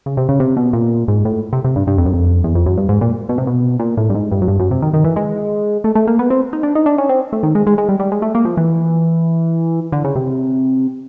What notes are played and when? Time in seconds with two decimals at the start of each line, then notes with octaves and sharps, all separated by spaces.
0.06 C#3
0.17 C3
0.29 C#3
0.40 C3
0.57 B2
0.73 A#2
1.08 G#2
1.25 A2
1.53 C3
1.65 C3
1.76 G2
1.87 G2
1.98 F2
2.06 F#2
2.13 F2
2.44 E2
2.55 F2
2.66 F#2
2.77 G2
2.89 G#2
3.01 A#2
3.29 B2
3.38 C3
3.47 B2
3.80 A#2
3.97 A2
4.10 G2
4.15 G#2
4.32 G2
4.42 F#2
4.48 G2
4.60 F#2
4.71 C3
4.82 D#3
4.94 D#3
5.04 E3
5.16 G#3
5.84 A3
5.95 A3
6.07 A#3
6.19 B3
6.30 C4
6.53 D#4
6.63 D4
6.75 D#4
6.86 D4
6.98 C#4
7.09 C4
7.33 A3
7.43 D#3
7.55 G#3
7.67 G#3
7.78 G#3
7.89 G3
7.99 G3
8.12 G#3
8.22 A3
8.35 A#3
8.45 F3
8.57 E3
9.92 D3
10.04 C#3
10.15 C3